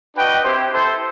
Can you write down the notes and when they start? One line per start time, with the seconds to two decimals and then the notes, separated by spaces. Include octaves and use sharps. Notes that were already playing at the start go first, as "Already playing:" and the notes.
0.16 D4 F#4 B4 D#5 G5
0.44 C4 E4 G4 C5
0.72 E4 A4 C5